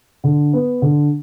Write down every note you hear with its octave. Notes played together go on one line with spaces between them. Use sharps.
D3
B3
D3